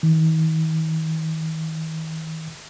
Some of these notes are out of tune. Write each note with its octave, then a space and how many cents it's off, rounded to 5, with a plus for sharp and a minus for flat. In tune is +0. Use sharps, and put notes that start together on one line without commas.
D#3 +45